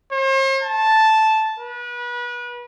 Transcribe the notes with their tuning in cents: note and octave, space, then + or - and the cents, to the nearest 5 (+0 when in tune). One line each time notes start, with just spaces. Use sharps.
C5 +45
A5 -5
B4 -30